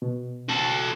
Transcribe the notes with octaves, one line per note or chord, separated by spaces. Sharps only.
B2
F#4 A4